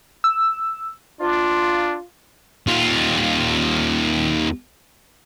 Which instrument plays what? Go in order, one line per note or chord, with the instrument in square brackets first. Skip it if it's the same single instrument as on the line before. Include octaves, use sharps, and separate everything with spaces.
[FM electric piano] E6
[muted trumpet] D4 [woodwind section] F4
[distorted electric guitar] D#2 F4